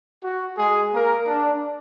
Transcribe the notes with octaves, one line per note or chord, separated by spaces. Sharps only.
F#4
G#3 G#4
A#3 A#4
D4